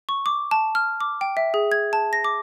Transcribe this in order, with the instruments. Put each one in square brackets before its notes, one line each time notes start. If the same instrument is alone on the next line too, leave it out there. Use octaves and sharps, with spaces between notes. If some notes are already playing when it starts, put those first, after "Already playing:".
[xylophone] C#6
D6
A5
F6
D6
G5
E5
G#4
G#6
A5
A#6
D6